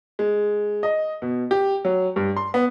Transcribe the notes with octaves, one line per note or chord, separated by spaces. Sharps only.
G#3
D#5
B2
G4
F#3
G2
C6
B3